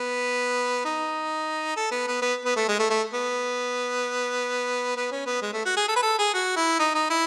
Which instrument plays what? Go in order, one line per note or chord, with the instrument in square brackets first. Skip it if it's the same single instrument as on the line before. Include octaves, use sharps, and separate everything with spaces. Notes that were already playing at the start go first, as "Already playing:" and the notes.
Already playing: [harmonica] B3
D#4
A4
B3
B3
B3
B3
A3
G#3
A3
A3
B3
B3
C#4
B3
G#3
A3
F#4
G#4
A4
B4
A4
G#4
F#4
E4
D#4
D#4
E4